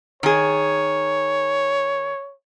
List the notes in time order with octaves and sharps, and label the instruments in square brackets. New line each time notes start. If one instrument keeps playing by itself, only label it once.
[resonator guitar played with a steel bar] D#3 G#4 [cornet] C#5